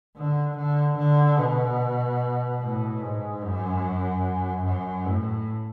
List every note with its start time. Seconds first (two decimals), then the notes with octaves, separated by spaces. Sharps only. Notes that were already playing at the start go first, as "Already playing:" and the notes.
0.16 D3
0.57 D3
0.98 D3
1.39 B2
2.62 A2
3.02 G#2
3.43 F#2
4.65 F#2
5.07 A2